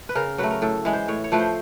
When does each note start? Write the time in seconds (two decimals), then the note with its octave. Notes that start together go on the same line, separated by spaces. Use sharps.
0.09 B4
0.15 C#3 A#4
0.38 F#3 A3 B4
0.51 A#4
0.62 A2 A4
0.85 E3 G#3
0.93 C5
1.08 A2 C#5
1.24 C#5
1.32 F3 A3 B4
1.40 C5